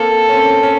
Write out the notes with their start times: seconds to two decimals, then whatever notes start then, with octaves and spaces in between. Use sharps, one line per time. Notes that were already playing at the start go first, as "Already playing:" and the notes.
Already playing: A#3 C4 A4
0.29 C#4
0.35 C4
0.63 C#4